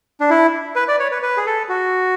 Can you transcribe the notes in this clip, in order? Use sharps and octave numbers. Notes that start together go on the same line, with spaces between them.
D4
E4
B4
D5
C#5
B4
B4
G#4
A4
F#4